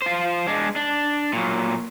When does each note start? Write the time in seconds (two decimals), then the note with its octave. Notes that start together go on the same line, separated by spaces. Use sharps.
0.02 F4 C5
0.48 G#3 D4
0.76 D4
1.33 A#2 F#3